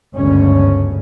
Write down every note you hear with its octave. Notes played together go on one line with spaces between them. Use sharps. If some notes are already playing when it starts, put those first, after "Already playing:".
G1 D2 G#2 C#3 C#4